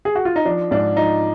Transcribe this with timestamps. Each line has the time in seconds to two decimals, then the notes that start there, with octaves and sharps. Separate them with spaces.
0.05 G#4
0.15 F#4
0.25 F4
0.36 D#4
0.45 F3 D4
0.71 G#2 D4
0.96 F3 D#4